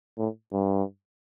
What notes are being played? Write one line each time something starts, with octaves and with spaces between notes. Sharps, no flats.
A2
G2